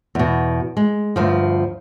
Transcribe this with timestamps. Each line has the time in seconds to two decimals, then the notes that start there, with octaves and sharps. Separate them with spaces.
0.15 E2 B2
0.77 G#3
1.16 D2 G2 F3